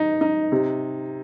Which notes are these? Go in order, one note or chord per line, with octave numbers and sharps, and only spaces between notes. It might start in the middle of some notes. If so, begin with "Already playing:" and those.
Already playing: D#4
D#4
C3